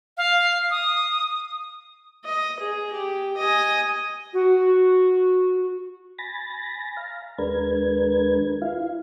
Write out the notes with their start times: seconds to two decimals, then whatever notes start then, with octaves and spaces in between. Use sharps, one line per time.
0.17 F5
0.71 D#6
2.25 D#5
2.59 G#4
2.93 G4
3.37 D#5 G#5
4.33 F#4
6.19 G#5 B5 A6 A#6
6.97 F5 A#5
7.38 D#2 G#3 D4 A#4 B4 G#6
8.62 E4 F4 F5